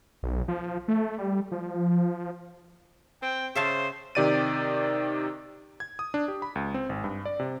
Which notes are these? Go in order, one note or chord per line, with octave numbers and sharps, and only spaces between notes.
B1
F3
A3
G3
F3
C4 G5
C#3 C5 E5 F5 A5
C3 D#3 G4 D5 A6 D#7
G#6
D#6
D4
G4
B5
C#2
C4
G#1
G2
D5
C3